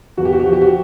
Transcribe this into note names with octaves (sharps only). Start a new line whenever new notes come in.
E2 F#4
G4
F#4
G4
F3 F#4
G4
F#4